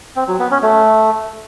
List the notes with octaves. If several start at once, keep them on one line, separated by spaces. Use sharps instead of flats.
C4
F#3
B3
C#4
A3